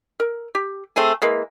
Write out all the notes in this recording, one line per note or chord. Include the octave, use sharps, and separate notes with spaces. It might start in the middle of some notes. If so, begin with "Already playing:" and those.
A#4
G4
A3 C4 G#4 G#5
E3 G#3 A#3